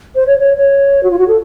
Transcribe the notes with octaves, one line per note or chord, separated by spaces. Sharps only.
C5
C#5
C#5
C#5
F#4
F4
F#4
A4